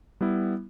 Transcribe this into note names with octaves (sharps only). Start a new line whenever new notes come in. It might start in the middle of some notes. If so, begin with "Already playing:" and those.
G3 B3 E4